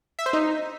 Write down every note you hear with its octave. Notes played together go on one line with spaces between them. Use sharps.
E5
C5
D#4